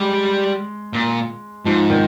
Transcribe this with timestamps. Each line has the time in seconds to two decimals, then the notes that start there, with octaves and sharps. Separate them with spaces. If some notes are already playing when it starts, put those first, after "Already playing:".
Already playing: G3 G#3
0.93 A#2
1.65 G#2 F3
1.90 D#3